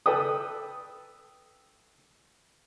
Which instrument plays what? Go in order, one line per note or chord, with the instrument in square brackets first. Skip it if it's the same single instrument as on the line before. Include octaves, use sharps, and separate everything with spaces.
[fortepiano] A4 B4 G5 D#6